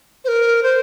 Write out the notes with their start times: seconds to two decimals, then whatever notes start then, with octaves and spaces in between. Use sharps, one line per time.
0.25 C5
0.28 A#4
0.63 C5